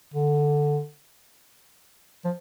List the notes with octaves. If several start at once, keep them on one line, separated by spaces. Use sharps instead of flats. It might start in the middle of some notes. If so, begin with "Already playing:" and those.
D3
F3